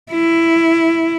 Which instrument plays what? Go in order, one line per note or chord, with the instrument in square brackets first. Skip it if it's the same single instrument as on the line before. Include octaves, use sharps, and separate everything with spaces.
[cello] E4